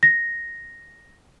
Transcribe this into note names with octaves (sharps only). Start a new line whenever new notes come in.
A#6